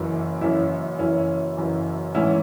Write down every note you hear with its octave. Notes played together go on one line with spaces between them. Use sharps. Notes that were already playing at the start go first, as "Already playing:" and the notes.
Already playing: F#1 F#2 E3
F#1 F#2 E3 C#4 E4
F#1 F#2 E3 C#4 E4
F#1 F#2 E3
A1 G#2 E3 C#4 E4